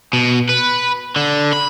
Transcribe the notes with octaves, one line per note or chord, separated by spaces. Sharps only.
B2
B4
D3
B5